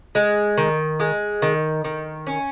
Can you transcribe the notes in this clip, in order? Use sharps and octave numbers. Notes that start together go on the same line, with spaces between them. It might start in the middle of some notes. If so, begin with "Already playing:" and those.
G#3
D#3
G#3
D#3
D#3
C#4